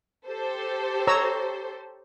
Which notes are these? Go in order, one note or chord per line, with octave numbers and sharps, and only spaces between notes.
G4 A4 C5
C#5 A#5 E6